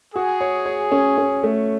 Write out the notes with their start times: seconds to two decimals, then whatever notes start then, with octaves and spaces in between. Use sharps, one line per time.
0.15 F#4 G#4
0.41 C#5
0.66 C#5
0.92 C#4
1.18 C#4
1.43 A3